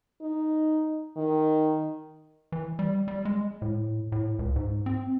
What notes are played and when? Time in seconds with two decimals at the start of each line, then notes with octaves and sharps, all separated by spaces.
0.22 D#4
1.17 D#3
2.52 E3
2.79 G3
3.08 G3
3.25 G#3
3.62 A2
4.12 A2
4.39 C#2
4.56 G#2
4.86 C4